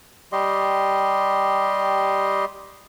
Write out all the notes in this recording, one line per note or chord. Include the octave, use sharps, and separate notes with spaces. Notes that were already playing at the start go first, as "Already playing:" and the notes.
G3 G4 D#5 C6